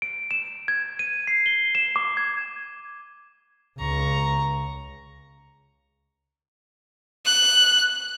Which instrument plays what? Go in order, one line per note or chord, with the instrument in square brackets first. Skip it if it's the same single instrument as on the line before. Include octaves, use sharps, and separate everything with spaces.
[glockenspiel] D7
E7
G#6
D#7
C7
G7
E7
D6
G#6
[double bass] C#2 [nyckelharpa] A#5 C#6
[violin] F#6